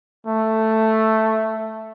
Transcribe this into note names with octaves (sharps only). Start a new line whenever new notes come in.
A3